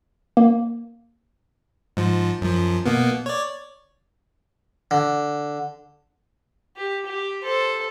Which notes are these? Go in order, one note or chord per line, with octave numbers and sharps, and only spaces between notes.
A#3
G#2 F3
F#2 F3
B2 A#3 B3
C#5 D5
D3
G4
G4
A4 C5